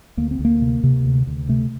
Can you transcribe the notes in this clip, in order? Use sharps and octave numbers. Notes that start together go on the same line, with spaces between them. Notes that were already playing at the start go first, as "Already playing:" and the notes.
D2 A#3
C4
D2
A#3
C3
C3
D2
D2
C3 A3